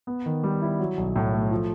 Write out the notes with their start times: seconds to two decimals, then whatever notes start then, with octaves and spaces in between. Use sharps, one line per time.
0.07 B3
0.26 D#3
0.44 G3
0.62 E4
0.79 F#3
0.97 B1
1.16 A2
1.33 A3
1.51 F3